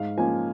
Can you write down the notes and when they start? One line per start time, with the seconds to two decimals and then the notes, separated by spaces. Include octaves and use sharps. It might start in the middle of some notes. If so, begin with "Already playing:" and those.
Already playing: G#2 F5
0.17 F3 A#3 C#4 G#5